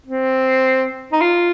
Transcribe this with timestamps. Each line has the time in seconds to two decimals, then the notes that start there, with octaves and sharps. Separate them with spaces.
0.06 C4
1.12 D#4
1.21 F4